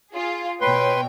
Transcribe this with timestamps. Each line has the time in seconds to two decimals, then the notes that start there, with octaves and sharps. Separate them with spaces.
0.12 F4 G#4
0.61 B2 B4 C#5 G5 C6